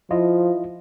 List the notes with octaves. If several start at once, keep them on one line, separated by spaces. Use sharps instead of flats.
F3 E4 F4 D#5